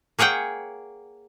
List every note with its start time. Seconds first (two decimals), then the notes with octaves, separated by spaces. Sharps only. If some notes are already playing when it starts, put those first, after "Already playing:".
0.19 A#3 G#4 C#5 F#5 G5